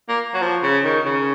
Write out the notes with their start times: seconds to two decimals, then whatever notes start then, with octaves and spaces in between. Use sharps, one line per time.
0.09 A#3
0.34 F#3
0.42 F3
0.63 C#3
0.85 D#3
1.05 C#3